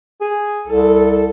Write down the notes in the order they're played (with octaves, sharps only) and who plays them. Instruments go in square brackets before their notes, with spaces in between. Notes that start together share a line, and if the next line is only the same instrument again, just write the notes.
[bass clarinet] G#4
[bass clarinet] C2 [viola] A4